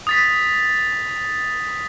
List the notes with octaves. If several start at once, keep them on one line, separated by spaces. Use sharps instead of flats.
D#6 A6 B6